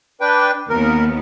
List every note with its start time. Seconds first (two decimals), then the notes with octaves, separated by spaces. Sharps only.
0.21 D4 B4 G5
0.70 D#2 B3 A#4